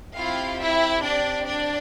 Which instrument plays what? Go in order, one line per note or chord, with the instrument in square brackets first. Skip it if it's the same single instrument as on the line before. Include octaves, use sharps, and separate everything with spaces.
[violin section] C4 E4 F4 G4 F5
E4 E5
D4 D5
D4 D5